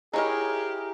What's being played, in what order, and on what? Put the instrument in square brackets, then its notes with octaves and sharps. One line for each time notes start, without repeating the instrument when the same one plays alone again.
[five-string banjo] D#4 C#5 D#5 [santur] E4 A#4 [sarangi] G4 [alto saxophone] G#4